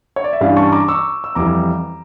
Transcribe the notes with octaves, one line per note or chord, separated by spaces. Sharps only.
C#5
D5
E5
G2 E3 G3 C#4 D5 F5
A5 C#6
A#5 D6
C#6 E6
E6
F2 E3 G3 A#5 D6